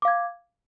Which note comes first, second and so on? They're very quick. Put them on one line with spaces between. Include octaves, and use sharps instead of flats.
D6 F5 G#6